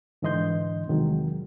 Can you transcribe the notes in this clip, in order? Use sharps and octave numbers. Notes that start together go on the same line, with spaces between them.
G#2 D3 E3 D#5 C6 G6
E2 C3 D#3 F#3 G#3